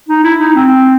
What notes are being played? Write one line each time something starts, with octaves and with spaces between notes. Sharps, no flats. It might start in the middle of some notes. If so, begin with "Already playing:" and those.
D#4
E4
D#4
C4